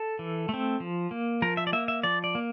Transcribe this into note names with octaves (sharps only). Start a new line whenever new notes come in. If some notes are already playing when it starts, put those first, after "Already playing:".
Already playing: A4
E3
A3 C4
F3
A#3
F3 A#4
E5
D5
A#3 E5
E5
F3 D5
D5
A#3